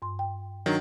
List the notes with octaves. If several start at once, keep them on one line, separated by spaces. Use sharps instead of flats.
G2 C6
G5
D#3 F#3 D4